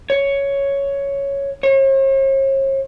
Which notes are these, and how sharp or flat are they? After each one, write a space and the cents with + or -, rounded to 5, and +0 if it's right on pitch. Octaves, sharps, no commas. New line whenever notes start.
C#5 +5
C#5 -45